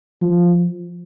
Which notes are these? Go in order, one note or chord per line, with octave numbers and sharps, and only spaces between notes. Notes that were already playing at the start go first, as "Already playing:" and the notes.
F3